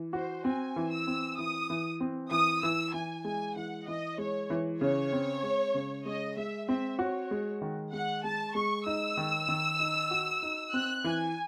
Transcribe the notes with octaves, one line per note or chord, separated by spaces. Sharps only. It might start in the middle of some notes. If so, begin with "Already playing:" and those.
Already playing: E3
F#4 C5
C4 G#5
E3
E6
C4
E3 D#6
E3
C4
E3 D#6
E3 E6
E3 G#5
G#3 G#5
E3 F#5
E3 D#5
G#3 C#5
E3
C#3 C#5
C4
G#3
C#3
G#3 D#5
G#3 E5
C4 E5
F#4 C#5
G#3
D#3
G#3 F#5
G#3 A5
G#3 C#6
D#4 E6
D#3
D#3
D#4
F#4
D#4
C4 F#6
E3 G#5